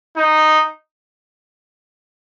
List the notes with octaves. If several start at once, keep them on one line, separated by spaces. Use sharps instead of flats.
D#4